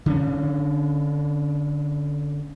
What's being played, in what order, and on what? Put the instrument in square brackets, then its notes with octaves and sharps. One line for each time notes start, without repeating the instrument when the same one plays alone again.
[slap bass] D3 C#4